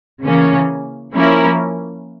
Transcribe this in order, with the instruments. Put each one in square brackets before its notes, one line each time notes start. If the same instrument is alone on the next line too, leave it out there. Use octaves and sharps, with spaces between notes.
[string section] C#3 E3 A#3 C#4
F3 A#3 C#4 E4 A#4